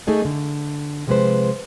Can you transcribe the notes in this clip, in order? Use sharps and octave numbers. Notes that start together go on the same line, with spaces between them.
A3 D#4 G#4 D#5
D3
C3 F3 G#3 G#4 B4 C5